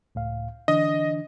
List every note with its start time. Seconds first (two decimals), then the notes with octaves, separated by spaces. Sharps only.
0.15 C#2 A2 F5
0.68 D3 E3 D4 D#5